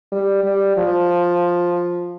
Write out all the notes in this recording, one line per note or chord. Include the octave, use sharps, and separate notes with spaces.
G3
G3
F3